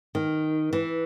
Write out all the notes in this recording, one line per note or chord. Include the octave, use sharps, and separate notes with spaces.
D#3
E3